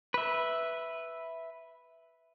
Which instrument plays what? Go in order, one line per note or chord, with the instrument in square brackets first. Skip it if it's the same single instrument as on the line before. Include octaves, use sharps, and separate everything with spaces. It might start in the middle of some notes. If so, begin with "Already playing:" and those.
[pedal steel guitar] B4 E5